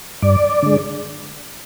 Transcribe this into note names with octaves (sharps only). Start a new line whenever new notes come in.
G2 D5
D3 G#3